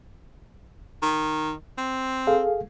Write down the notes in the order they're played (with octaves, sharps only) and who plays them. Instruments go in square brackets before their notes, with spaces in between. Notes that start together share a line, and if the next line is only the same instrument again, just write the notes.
[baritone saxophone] D#3
C4
[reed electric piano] G#4 A4 F5